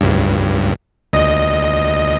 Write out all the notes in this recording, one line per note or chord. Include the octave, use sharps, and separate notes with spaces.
C#2 G2
D2 D#5